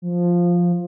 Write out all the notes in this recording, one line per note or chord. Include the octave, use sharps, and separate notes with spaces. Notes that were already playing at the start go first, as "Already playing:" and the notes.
F3